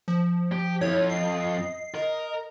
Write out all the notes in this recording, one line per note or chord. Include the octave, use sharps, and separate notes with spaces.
F3
G4
F2 E4 C#5
D#5 C7
A#4 D#5